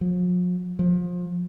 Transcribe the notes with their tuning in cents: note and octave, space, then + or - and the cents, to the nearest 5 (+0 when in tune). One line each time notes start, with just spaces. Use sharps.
F3 +45
F3 +25